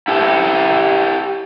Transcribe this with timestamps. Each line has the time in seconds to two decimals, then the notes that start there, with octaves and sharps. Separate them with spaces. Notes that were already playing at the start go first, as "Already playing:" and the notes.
0.08 E4 G4 A4